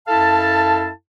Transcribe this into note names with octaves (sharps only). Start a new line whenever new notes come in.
F#2 E4 A4 F5 A5